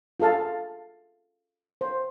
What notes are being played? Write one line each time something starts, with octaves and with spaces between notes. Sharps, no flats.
F4 G#4 A4 F5 A5
C5